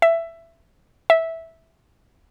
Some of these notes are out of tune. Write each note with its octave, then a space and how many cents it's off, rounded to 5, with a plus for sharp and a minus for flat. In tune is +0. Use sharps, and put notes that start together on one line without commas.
E5 +15
E5 -10